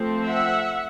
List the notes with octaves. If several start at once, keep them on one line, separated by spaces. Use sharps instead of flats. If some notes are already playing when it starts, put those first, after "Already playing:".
Already playing: F3 A3 C4
E5 F#5